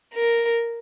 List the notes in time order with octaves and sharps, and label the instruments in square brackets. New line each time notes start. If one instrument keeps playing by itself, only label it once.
[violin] A#4